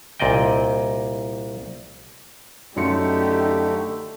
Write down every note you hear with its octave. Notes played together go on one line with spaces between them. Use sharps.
C2 A#2 D5 D#5 G5
F#2 D3 A3 D#4 G4 C6 C#7